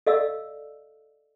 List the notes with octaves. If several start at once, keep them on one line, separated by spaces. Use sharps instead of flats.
A4 D5 D#5 F5 E6